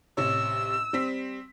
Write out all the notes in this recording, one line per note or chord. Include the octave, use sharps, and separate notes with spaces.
A1 C3 C#5 E6
G3 C4 B6